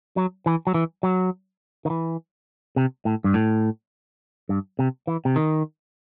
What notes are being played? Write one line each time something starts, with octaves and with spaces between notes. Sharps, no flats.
F#3
E3
F#3
E3
F#3
D#3
E3
C3
A2
G2
A2
G2
C3
E3
C3
D#3